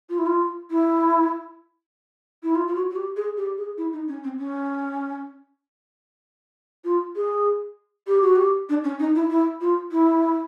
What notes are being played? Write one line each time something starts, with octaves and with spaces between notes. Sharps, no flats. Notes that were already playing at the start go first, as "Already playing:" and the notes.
F4
E4
F4
E4
E4
F4
F4
F#4
F#4
G4
G#4
G4
G#4
E4
D#4
C#4
C4
C#4
F4
G#4
G4
F#4
G4
D4
C#4
D#4
E4
E4
F4
E4